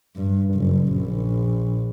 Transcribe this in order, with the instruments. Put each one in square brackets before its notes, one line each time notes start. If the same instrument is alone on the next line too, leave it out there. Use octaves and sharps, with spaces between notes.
[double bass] G2
F#1
A#1